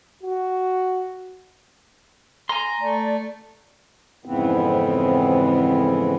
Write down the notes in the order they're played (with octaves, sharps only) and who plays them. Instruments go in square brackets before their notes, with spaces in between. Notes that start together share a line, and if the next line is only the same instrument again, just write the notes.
[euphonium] F#4
[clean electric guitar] G#5 C6 [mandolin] A#5
[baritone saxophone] A3 [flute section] D5
[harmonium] F2 G#2 C#3 E3 B3 C4